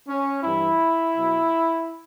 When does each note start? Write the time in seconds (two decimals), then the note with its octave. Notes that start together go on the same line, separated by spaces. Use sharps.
0.08 C#4
0.43 G2 E3 G3 E4
1.15 B2 F#3